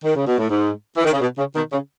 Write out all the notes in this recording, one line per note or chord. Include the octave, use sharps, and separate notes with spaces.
D#3
C#3
B2
A2
G#2
E3
D#3
C#3
B2
C#3
B2 D#3
C#3